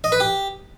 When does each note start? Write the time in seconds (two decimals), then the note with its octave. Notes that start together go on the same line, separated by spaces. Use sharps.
0.04 D#5
0.12 B4
0.20 G4